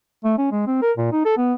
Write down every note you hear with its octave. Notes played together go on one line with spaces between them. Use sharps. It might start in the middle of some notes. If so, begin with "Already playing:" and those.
A3
C#4
G#3
C4
A#4
A#2
D#4
A4
B3